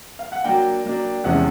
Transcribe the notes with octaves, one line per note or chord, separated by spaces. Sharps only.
F5
F#5
F#3 A#3 D4 G5
F#3 A#3 D4
E2 C3 F3 G#3 C#4 F#5